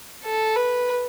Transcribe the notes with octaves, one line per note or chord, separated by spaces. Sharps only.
A4
B4